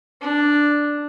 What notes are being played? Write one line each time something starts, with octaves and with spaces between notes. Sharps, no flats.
D4